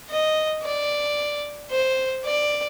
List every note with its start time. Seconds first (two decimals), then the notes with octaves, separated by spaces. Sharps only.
0.10 D#5
0.64 D5
1.71 C5
2.25 D5